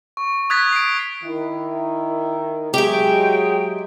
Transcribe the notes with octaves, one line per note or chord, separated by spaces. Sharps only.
C#6
D#6 F#6 G#6 A6 B6
C7 D7
D#3 E4
F#3 G#3 G4 G#4 E5 G5